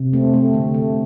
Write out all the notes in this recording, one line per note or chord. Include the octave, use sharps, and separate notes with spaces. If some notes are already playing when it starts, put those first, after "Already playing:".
Already playing: C3
A3 C4
A3
D3
A3